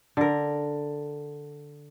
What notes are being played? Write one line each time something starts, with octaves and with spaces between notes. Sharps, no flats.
D3 A#4